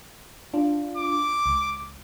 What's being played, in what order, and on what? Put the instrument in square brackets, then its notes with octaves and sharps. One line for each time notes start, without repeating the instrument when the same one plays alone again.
[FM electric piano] D4 F4
[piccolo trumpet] D6
[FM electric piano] C#2